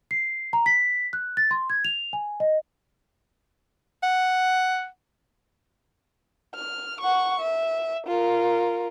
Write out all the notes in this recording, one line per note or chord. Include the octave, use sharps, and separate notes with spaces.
C7
A#5
B6
F#6
A6
C6
G#6
F7
G#5
D#5
F#5
F6
F#5 C#6
E5
F4 A#4